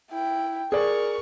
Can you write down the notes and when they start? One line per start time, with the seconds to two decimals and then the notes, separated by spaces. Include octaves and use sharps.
0.11 E4 G5
0.72 G#4 A#4 D5 C#6